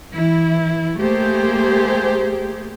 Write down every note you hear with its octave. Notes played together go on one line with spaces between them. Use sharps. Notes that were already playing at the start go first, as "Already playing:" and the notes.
E3 E4
A3 A#3 G4 G#4 C5